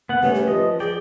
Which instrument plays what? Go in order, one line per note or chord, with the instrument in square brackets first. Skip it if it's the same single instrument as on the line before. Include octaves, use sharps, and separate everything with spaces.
[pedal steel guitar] B3 F#5
[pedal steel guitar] G3 A3 C#4 [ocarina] B4
[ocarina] G4
[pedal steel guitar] F3 D#5 [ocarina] B4
[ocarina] G#4 [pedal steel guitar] D5 G5